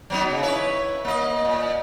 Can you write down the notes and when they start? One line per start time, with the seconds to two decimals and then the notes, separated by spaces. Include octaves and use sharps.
0.10 F#3 B3 D#4
0.30 C#3
0.43 E4 B4 C#5
1.05 A#3 D#5
1.45 A#2